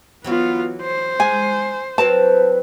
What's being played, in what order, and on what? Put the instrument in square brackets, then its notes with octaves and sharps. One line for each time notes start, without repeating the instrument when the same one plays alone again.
[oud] E3 F#3 F#4 [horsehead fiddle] B3 F4
[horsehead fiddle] C5
[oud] G#3 [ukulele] G#5
[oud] F#3 C4 A#4 [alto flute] B4 [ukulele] A5